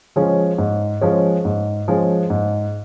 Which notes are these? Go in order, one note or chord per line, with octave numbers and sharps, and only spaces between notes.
F3 G#3 C#4
G#2
F3 G#3 C#4
G#2
F3 G#3 C#4
G#2